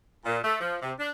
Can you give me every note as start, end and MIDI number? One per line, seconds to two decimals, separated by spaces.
0.25 0.38 46
0.44 0.56 57
0.60 0.76 53
0.82 0.93 48
0.99 1.11 62